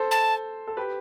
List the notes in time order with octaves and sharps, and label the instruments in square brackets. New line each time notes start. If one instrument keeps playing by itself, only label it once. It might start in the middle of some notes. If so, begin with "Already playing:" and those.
Already playing: [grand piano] A4 C5
[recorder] A5
[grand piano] A4
G4 B4